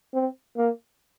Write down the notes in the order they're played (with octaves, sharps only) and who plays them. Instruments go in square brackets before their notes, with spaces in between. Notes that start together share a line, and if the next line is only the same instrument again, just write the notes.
[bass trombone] C4
A#3